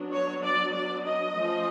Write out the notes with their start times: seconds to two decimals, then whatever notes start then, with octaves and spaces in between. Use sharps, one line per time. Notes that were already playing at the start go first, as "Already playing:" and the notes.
Already playing: F#3 B3 D4
0.12 C#5
0.43 D5
0.74 D5
1.06 D#5
1.36 F3 A3 C#4